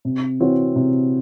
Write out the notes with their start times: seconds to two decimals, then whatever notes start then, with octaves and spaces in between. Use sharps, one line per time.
0.05 C3
0.40 E3 C4 F#4 C#5
0.76 C3